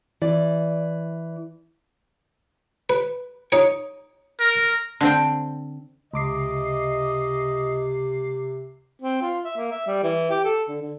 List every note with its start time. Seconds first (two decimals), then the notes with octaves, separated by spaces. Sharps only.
0.22 E3 D5
2.90 B4
3.52 D#4 C#5 G#5
4.40 A#4
5.01 D3 C4 G5
6.13 C#2 C3 D#5 D6 C7
9.02 C4
9.22 F4
9.45 E5
9.57 A#3
9.72 E5
9.87 G3
10.03 E3
10.30 G4
10.45 A4
10.69 D3
10.82 D3